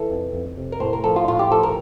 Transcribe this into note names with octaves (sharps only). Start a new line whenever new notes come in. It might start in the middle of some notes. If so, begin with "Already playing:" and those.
Already playing: E3 A4
F2
F2
C3
A#4
A2 C5
A#4
F3 A4
F4
A2 F4
G4
F3 A4
A#4